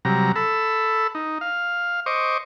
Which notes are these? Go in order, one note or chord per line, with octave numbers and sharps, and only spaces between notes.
C3 F#3 G3 A#5
A4 B5 E6
D#4
F5
C5 D#5 C#6 D6